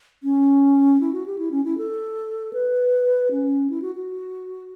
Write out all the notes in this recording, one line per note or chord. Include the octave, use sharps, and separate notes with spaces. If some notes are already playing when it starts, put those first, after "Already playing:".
C#4
E4
F#4
G4
E4
C#4
E4
A4
B4
C#4
E4
F#4
F#4